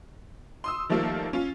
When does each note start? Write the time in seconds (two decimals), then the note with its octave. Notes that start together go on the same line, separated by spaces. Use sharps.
0.64 C6 D#6 E6
0.89 D#3 F3 G3 A3 A#3 F4
1.33 C#4 F4